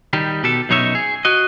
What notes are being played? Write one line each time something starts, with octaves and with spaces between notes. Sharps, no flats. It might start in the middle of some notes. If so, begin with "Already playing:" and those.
D#3 G3 G4
B2 G4 A4
F#2 B2 D#4 C#5 E5
G#4
F#4 D#5